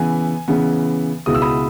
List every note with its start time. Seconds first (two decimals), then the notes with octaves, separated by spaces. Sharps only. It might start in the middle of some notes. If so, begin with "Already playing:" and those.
Already playing: C#3 E3 B3 G#5
0.48 C#3 E3 B3
1.26 C#2 B2 G#3 B3 E4 D#6
1.35 E6
1.42 B5 D#6